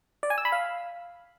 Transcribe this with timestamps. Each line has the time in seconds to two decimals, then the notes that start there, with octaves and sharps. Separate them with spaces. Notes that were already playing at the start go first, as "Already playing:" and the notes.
0.23 D5
0.30 G#5
0.38 E6
0.45 B5
0.52 F5